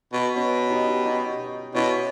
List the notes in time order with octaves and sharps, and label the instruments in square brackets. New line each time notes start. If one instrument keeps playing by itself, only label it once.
[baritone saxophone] B2
[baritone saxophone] B2 [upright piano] C#4
[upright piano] D#4 G4
D#4 G4
D#4 G4
[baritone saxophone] B2 [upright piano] C#4 E4